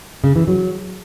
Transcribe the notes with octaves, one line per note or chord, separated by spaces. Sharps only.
C#3
E3
F#3